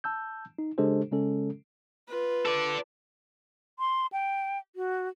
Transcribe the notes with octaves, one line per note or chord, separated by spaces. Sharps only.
A5 E6 G6
D#4
C#3 G#3 D4 G4 A4 C5
C#3 G#3 C#4 A4
F4 B4
A4 D5
C6
G5
F#4